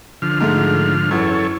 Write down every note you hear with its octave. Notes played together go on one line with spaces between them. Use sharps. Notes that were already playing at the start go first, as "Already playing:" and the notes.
D3 F3 F6
G#2 A3
F#2 E3 A4 C#5